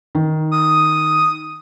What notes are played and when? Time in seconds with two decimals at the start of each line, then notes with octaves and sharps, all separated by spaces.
0.15 D#3
0.51 D#6